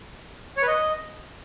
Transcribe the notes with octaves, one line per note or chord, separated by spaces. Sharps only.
C#5
B4
D#5